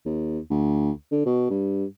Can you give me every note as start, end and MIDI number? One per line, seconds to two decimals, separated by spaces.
0.06 0.39 39
0.50 0.91 38
1.12 1.21 50
1.25 1.46 47
1.50 1.85 43